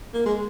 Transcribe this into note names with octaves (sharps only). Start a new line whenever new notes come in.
A#3
G#3